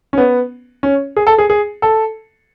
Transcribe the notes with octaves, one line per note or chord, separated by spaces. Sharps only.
C#4
B3
C#4
G#4
A4
G#4
G#4
A4